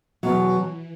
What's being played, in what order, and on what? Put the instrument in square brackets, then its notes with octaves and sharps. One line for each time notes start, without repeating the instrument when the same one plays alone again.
[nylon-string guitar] E2 B2 F#3 [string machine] E3